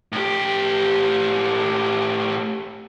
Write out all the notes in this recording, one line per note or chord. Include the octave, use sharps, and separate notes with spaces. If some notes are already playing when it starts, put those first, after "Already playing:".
A2 G4